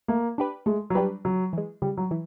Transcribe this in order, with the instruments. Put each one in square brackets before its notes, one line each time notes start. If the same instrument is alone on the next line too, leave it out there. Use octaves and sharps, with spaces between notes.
[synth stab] A3 [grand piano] A#3
[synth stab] D4 G4 B4
[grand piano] G#3 [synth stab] A3
[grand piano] F#3
[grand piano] G3 [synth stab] D4 G4 B4
[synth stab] C#3 [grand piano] F#3
[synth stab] E3 G#3
[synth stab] C#3 [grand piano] G3
[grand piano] F#3
[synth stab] E3